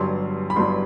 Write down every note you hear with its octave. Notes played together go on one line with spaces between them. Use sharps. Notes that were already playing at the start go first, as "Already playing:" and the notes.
Already playing: G1 G2 F#3 C6
B5
G1 G2 F#3 C6